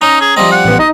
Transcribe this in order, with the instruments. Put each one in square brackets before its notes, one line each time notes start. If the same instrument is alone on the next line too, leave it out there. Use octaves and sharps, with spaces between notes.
[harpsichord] C#4 [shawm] D#4 [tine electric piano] A#5
[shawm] G#4
[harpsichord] F3 G3 C4 [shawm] D#5
[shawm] F#5
[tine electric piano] A1 B3
[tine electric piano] D#4 [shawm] D#5